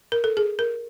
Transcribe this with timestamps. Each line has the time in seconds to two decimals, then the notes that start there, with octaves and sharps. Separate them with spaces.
0.12 A#4
0.24 A4
0.37 G#4
0.59 A#4